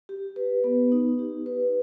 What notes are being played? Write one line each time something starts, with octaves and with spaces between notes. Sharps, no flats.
G4
B4
B3
D#4
G4
B4